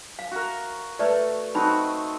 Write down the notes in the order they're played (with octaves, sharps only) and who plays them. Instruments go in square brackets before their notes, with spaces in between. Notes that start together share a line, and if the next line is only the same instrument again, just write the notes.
[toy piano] F5
[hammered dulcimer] F#4 A#4
[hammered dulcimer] A3 [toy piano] B4 D5
[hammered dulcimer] C4 F#4 D#5 [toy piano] D#4 B5